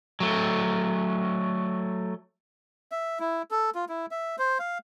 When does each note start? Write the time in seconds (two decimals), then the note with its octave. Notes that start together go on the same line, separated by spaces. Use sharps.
0.20 F#3 A3
2.92 E5
3.20 E4
3.51 A4
3.75 F4
3.89 E4
4.11 E5
4.39 C5
4.59 F5